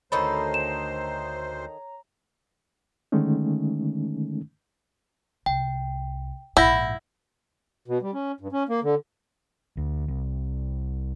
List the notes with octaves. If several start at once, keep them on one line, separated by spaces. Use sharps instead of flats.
D2 D#3 D#4 A4 C5 C#5 A#5 B5
E7
D3 D#3 G#3 A3 C#4 D#4
C2 G5
A#1 G#2 E4 F#5 G6 A#6
B2
G3
C#4
G2
C#4
A#3
D3
D2
C2